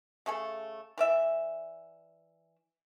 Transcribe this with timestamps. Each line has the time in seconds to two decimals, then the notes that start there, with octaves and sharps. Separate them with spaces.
0.26 C#3 A3 G#4 A4
0.98 E3 D5 E5